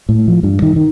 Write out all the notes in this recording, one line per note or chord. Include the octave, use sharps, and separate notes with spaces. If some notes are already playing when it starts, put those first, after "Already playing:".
A2
F3
G2
D#3
D#3